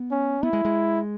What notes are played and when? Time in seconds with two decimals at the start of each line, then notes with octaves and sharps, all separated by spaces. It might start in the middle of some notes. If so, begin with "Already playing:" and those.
Already playing: B3
0.11 C#4
0.43 B3 E4
0.53 G#3
0.65 G#3